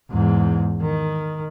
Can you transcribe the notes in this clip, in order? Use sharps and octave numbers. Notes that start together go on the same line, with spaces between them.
E2 G#2
D#3